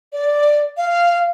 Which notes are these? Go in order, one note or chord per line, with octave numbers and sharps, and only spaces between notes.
D5
F5